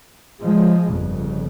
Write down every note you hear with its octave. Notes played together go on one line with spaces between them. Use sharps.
F3 G#3
G1 F2 C#3